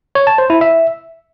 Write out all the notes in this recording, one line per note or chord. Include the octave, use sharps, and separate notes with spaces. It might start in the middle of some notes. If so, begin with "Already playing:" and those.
C#5
A5
C5
E4
E5